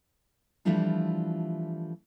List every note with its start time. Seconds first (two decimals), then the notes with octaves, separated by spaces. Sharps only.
0.65 E3 F3 G3 A3 D4 F4